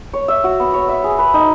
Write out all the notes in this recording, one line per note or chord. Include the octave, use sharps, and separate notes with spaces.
C#5
E5
F#4
B3
C#5
E5
G#4
B4
D#4